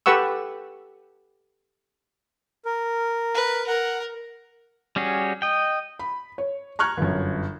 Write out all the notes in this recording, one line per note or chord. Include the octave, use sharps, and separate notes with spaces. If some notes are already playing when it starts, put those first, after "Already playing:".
G4 A4 B4 F#5 C#6 E6
A#4
B4
A#4 F#5
G3 C#4 F#4 G#4
D#5 G5
B5
C#5
A#5 C#6 F6 F#6 G#6
G1 F#2